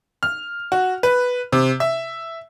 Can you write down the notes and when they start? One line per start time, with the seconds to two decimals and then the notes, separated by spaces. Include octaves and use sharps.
0.23 F6
0.72 F#4
1.03 B4
1.52 C3
1.80 E5